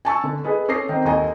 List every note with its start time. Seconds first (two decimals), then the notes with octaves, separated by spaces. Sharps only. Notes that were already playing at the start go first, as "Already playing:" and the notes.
0.05 G#5 A5 C#6 E6
0.24 D3
0.44 G#4 A4 B4 D#5
0.68 C#4 A4 D6 D#6 A#6 C7
0.89 D#3 C4
1.05 D#2 A4 D#5 G#5